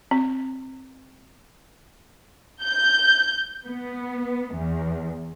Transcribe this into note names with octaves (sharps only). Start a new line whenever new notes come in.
C4
G6
B3
E2